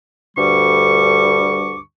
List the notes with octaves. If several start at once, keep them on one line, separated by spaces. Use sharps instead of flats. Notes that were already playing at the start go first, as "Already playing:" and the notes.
D2 G2 D3 G3 C#6 D6